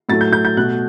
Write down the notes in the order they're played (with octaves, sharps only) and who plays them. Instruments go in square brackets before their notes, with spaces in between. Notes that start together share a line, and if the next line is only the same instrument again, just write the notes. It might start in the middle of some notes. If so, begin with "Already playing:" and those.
[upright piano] A2 F#3 A3 A6
G6
G6
G6
B2 A3 F#6